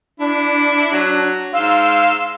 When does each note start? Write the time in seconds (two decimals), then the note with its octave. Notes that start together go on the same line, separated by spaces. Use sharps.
0.20 D4 E4
0.92 F#3
1.54 G#2 F5 C6 E6